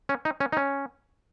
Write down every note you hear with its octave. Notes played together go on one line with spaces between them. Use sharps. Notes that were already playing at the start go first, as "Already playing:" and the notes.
C#4
D#4
C#4
D#4
C#4